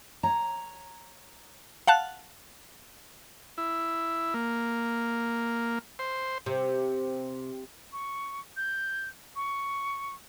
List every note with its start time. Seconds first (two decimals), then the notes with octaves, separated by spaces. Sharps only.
0.23 C#5 A#5
1.87 F5 F#5 A5 F#6
3.58 E4
4.34 A#3
5.99 C5
6.46 C3
7.93 C#6
8.57 G6
9.36 C#6